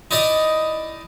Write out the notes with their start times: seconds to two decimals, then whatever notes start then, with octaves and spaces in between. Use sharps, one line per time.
0.11 D#4 E4 D5 D#5